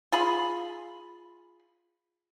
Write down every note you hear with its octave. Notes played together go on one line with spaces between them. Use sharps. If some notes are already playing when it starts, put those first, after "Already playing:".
F4 G#4 B5